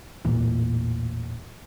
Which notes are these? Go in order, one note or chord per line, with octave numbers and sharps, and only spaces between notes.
A1 E2 A#2 E3